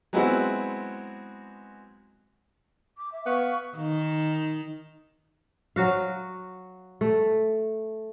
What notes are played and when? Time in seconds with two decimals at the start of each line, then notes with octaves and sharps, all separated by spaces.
0.13 F#3 G#3 B3 C4 E4 F#4
2.98 D6
3.12 E5
3.26 B3 F5 C#6
3.76 D#3
5.76 F#3 F#4 F5
7.01 A3